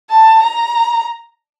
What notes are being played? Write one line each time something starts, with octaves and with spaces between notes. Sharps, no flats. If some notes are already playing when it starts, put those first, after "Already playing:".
A5
A#5